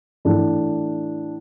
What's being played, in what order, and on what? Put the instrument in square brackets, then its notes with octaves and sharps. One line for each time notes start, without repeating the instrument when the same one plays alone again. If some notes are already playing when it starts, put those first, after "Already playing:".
[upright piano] A2 E3 D4